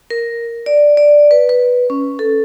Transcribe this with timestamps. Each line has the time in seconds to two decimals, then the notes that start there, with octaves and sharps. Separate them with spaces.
0.10 A#4
0.66 D5
0.97 D5
1.31 B4
1.49 B4
1.90 C#4
2.19 A4